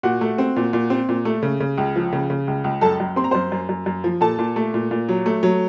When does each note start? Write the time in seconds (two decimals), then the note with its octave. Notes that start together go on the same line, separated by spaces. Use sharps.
0.03 A#2 F#4 F#5
0.21 A3
0.38 C4
0.56 A#2
0.73 A#2
0.90 C4
1.09 A#2
1.25 A3
1.42 C#3
1.60 C#3
1.78 C#2
1.96 F3
2.12 C#3
2.30 C#3
2.48 C#2
2.64 C#2
2.81 F#2 A4 A5
3.00 F#2
3.16 C4 C6
3.24 A#5
3.31 F#2 C5 C6
3.52 F#2
3.69 F#2
3.86 F#2
4.04 F3
4.21 A#2 A4 A5
4.39 A#2
4.56 A3
4.74 A#2
4.91 A#2
5.09 F#3
5.26 A3
5.43 F#3